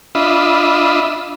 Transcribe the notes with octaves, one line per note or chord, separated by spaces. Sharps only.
D4 F4 D#5 E5 B5